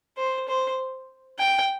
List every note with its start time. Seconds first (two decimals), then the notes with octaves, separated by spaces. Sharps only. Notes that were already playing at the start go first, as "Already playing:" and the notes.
0.17 C5
0.48 C5
1.39 G5